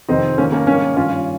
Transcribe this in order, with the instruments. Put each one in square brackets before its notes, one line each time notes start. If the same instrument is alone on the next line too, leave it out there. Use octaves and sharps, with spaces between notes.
[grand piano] F2 C3 D#3 C4 D#4
G#2 A#3 C#4
D#3
A#3 C#4
G#2 D#3 A#3 C#4
G2 D#3 C#4 F4